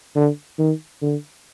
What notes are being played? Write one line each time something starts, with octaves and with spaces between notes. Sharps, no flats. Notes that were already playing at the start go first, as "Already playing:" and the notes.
D3
D#3
D3